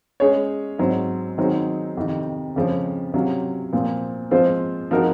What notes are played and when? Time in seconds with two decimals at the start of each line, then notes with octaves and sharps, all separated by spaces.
0.20 G#3 C#4 G#4 C#5
0.79 G#2 F#3 C4
1.38 D#3 F#3 C4 D#4 G#4
1.97 F2 C3 D#3
2.56 F2 C#3 F3 G#3 C#4
3.13 C3 F#3 C#4 F4
3.73 A#2 F3 C4
4.31 F3 G#3 C4 F4 C5
4.91 F3 C4 D#4 F#4 A#4